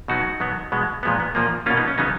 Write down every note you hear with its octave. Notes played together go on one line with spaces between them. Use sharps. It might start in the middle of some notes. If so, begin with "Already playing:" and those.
B2 F#3 B3 D#4 F#4
B2 F#3 B3
B2 G#3 B3
A#2 F3 G#3 B3
B3
A#2 F3 A#3
B2 A#3 C#4 F4
B3 D#4
C#4
C#3 F#3 B3 D#4